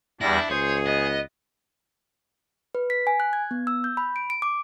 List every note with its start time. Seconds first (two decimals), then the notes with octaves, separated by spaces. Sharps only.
0.21 E2 G3 D4 E4 A#6
0.50 C#2 G#4 C5 C#5
0.86 B3 D#5
2.75 B4
2.90 B6
3.07 G#5
3.20 F#6
3.33 G#6
3.51 B3
3.67 E6
3.84 G6
3.97 B5
4.16 D7
4.30 D7
4.42 D6